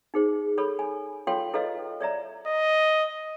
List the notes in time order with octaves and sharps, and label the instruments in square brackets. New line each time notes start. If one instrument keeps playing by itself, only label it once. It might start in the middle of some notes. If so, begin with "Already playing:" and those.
[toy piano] D#4 G#4 C5
A4 C#5 B5
G#5
F4 A4 C#5 F5 G5 C6
E4 A4 B4 C#5 D#5 F5
C#5 D5 E5 A#5
[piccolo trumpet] D#5